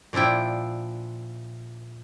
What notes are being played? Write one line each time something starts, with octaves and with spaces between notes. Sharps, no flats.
A#2 F3 D4 E4 G5